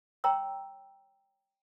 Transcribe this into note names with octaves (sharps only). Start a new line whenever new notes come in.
C#5 G5 A#5 C6 E6